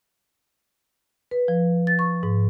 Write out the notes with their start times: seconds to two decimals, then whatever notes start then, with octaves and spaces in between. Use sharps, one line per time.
1.31 B4
1.48 F3
1.87 A6
1.99 C#6
2.23 G#2